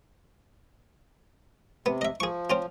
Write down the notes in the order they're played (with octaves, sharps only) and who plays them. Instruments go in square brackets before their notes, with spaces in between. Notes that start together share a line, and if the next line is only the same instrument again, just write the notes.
[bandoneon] C3 [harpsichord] B3
[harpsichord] D#5 E5
[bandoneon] F3 [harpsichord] G#4 C#6
[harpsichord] C4 C#4 F4